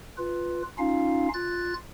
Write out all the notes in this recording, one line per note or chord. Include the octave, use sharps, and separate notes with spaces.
F4 B4
C#4 D#4 F4 F5
F4 F#6 A6